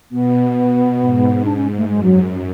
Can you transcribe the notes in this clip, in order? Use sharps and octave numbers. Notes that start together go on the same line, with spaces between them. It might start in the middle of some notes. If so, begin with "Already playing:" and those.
B2 B3
B2
G#2
D4
C#4
A3
F#2 G#3
F#3